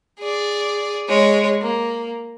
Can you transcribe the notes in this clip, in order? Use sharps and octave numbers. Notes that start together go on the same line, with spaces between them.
G#4 D5
G#3 C#5
A#3